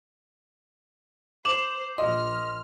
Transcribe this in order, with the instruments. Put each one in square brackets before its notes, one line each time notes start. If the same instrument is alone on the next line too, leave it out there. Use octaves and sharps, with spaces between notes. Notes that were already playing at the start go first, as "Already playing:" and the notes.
[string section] C5 [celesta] D6 F#7 [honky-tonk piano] E7
[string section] A#1 F6 [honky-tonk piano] D#5 [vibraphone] C6